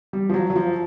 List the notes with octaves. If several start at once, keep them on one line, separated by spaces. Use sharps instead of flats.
G3
F3
F#3
F#3
F3